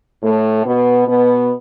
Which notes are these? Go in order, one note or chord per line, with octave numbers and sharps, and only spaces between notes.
A2 A3
B2 B3
B2 B3